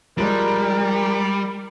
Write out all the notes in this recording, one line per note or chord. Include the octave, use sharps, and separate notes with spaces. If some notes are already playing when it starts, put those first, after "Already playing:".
F3 G3 G#3 A#4 D5